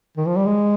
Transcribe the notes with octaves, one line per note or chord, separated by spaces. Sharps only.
D#3
F3
G3
G#3